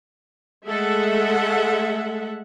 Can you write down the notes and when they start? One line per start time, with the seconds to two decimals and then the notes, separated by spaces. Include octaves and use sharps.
0.66 G#3 A3 A4 E5 F#5